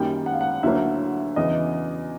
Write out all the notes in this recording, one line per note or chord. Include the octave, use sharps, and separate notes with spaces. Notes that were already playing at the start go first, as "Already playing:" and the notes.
Already playing: F#2 D#3 G3 A#3 G5
F#5
F5
F#5
D2 D3 F#3 A#3 E5
E2 C#3 E3 D#5